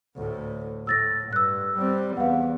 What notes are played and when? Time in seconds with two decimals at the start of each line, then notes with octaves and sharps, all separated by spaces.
0.17 D2 A2
0.87 A2 E6 A6 A#6
1.33 G2 E6 F#6
1.78 G3 C4
2.17 E2 B3 F5 F#5